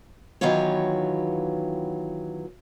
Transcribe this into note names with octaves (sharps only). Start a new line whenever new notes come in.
D#3 E3 F#3 B3 F4 C#5